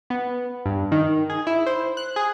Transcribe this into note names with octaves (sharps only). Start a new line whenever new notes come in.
B3
G2
D#3
G#4
E4
C5
F#6
G#4